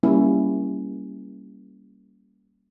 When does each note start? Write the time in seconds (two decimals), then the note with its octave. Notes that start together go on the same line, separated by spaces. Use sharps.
0.03 G3 A#3 C#4 E4